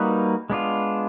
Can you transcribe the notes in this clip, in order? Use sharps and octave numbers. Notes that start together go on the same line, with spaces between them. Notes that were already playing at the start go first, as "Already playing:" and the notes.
Already playing: G3 A#3 D#4 F#4 B4
G#3 B3 D4 F4